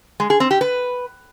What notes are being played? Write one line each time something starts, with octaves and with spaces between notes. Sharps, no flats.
G#3
G#4
C4
G4
B4